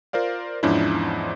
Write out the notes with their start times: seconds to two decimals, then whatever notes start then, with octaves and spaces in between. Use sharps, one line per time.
0.13 F4 A#4 C5 D5 F5
0.63 E2 G#2 F3 C#4 D4 E4